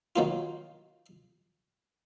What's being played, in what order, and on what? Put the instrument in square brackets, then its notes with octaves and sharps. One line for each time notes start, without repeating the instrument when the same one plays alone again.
[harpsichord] D#3 F#3 A#3 F4